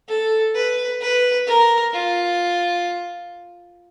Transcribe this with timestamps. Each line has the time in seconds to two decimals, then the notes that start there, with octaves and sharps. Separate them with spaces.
0.08 A4
0.55 B4
1.01 B4
1.47 A#4
1.93 F4